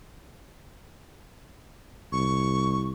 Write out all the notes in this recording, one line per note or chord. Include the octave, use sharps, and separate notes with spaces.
C2 C#6